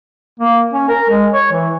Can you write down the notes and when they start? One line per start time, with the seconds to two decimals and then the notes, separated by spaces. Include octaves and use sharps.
0.40 A#3
0.73 C#4
0.89 A#4
1.10 G#3
1.33 C#5
1.52 E3